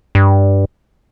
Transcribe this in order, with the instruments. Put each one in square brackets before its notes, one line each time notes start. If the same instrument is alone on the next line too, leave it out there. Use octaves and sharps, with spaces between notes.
[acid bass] G2